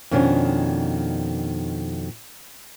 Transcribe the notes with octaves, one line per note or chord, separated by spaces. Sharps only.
F2 B2 D#3 C#4 D4